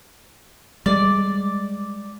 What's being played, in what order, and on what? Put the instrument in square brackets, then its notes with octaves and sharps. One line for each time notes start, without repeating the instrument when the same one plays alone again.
[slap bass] G3 G#3 [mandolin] D5